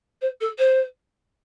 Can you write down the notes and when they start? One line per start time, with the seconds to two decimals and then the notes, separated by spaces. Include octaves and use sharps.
0.21 C5
0.40 A4
0.58 C5